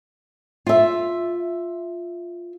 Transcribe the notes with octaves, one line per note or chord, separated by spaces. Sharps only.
F4 E5